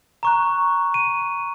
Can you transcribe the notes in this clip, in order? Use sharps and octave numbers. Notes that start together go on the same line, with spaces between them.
A#5 C#6 F#6
D#7